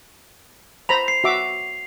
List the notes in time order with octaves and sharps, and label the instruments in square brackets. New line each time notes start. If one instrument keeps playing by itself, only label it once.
[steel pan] C5 A#5 B5 [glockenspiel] F7
[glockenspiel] C7
[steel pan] F#4 E5 D6